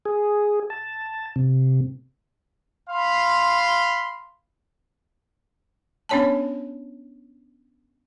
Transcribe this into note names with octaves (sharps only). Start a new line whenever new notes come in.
G#4
A5
C3
F5 B5 C6
B3 C#4 D4 C#5 G#5 A5